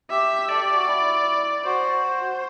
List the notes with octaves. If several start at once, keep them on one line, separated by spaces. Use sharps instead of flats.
G4 E5
A4 D5
G4
F#4
E4
F#4 C5
C5